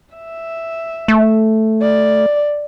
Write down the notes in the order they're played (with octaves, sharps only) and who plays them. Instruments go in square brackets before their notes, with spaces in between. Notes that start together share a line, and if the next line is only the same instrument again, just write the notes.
[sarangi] E5
[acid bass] A3
[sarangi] D5